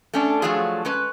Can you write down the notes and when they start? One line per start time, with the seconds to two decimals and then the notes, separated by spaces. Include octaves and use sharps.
0.14 A3 C#4 D4
0.42 F3 F#3 A3 D4 F4 G#4
0.85 G#3 C#4 B4